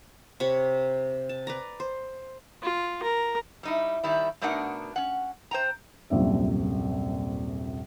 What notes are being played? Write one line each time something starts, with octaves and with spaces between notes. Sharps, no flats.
C3 C#5 B5 C#6
A5
B4 D5 A#5
C5
F4
A#4
G3 D#4 E4
D#3 G3 E4
B2 A3 D4 D#4 A#4 F#5
C#4 F#5
C5 G5 A#5
D#1 A#1 F#2 C3 E5